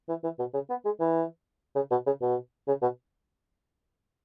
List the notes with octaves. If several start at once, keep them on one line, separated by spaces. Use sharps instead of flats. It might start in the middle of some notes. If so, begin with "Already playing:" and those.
E3
E3
B2
C#3
B3
G#3
E3
C#3
B2
C#3
B2
C#3
B2